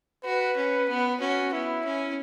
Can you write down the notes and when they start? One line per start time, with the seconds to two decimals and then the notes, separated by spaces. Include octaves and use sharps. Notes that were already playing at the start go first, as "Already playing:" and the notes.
0.24 F#4 B4
0.57 C#4
0.89 B3
1.21 C#4 F#4
1.53 B3 E4
1.85 C#4